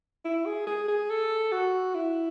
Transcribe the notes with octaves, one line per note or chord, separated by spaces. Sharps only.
E4
G#4
G#4
G#4
A4
F#4
E4